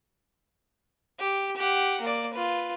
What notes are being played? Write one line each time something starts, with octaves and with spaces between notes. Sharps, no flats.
G4
G4 F#5
A#3 D5
F4 B4